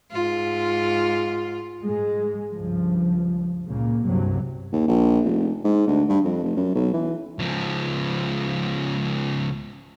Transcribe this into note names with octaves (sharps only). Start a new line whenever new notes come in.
G#2 F4
G#2 G#3
C#2 G2 F3
C#2 A#2 C#3 A#3
F#1 C2 G2 C3 F#3
D#2
A#1
F1
G#2
D2
G2
F2
F1
F#2
B1
E3
C#2 F3